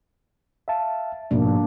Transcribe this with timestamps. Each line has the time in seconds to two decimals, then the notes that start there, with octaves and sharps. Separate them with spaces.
0.68 E5 F5 A5
1.31 G#2 B2 F3 A#3 D4